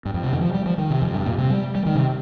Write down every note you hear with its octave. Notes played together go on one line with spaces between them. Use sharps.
G2
F2
C3
D#3
F3
G3
F3
D#3
C3
F2
G2
A#2
C3
G3
G3
D#3
C3